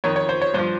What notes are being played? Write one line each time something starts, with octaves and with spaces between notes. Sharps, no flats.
F2 D#3 C#5
C#5
C5
C#5
G2 F3 C5